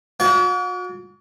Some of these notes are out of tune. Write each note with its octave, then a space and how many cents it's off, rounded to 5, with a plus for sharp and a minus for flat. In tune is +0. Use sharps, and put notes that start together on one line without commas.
F#4 -40 C#5 +45 G5 +5